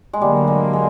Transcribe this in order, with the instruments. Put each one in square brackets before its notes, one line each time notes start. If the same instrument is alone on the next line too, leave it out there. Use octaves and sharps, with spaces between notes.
[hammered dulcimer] G#3
[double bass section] D3 F#3 A#3 [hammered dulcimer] G3
[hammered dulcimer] A3
G#3
G#3